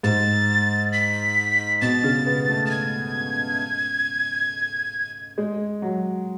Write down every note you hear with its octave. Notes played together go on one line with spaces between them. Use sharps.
G#2 A6
B6
B2 A6
C#3
B3
A3
A6
G#6
G#3
F#3